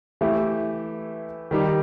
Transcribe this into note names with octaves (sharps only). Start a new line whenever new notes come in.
E3 A3 E4 G4
D#3 G3 D#4 G4